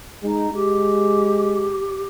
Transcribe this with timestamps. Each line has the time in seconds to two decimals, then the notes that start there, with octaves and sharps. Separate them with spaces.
0.23 G#3 D#4
0.53 G#3 G4